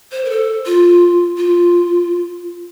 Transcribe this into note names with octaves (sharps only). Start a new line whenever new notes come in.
C5
A#4
A4
F4
F4